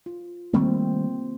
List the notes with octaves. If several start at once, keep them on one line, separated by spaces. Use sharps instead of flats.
F4
D#3 G3 A3 A#3 C4